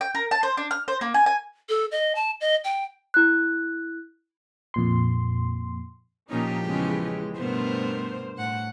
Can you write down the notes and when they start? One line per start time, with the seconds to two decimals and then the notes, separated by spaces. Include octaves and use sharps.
0.01 G5
0.15 A#4
0.31 A5
0.43 C5
0.57 D4
0.71 F6
0.88 C5
1.01 A#3
1.14 G#5
1.26 G#5
1.69 A4
1.91 D#5
2.15 A5
2.41 D#5
2.64 G5
3.14 E4 F#6
4.74 F2 A#2 C6
6.30 A#2 F3 A#3 C#4 D#4 G4
6.65 E2 C#3 E3 G#3 C#4
7.37 G2 B2 A3 B3 A#4 C5
8.37 A2 F#5